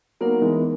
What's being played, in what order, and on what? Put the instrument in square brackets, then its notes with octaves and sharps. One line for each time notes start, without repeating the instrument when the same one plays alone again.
[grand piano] F#3 A#3 [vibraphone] B3 D#4 A#4
[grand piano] E3 G#3